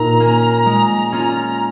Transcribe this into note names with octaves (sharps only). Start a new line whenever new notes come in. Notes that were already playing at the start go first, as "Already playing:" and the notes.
Already playing: A#2 D#4 A#5
A#3 C#4
G#3
C#4 F4